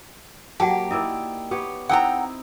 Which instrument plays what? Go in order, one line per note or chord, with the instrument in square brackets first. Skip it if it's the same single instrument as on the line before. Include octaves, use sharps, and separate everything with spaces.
[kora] F#3 A#3 [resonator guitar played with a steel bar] G4 [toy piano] F#5 G5 A5
[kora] D#4 E4 D5 [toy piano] A#4 E5
[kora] B3 G4 C#5
[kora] C4 D#4 E4 [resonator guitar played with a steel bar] F#5 G5 A#5